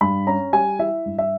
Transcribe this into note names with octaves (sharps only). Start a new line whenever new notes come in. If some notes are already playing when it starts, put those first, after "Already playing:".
G2 B5
C#4 A#5
G3 G#5
E4 E5
G2
E5